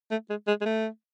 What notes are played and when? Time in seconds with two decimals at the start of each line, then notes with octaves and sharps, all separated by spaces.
0.11 A3
0.30 G#3
0.48 G#3
0.61 G#3
0.66 A3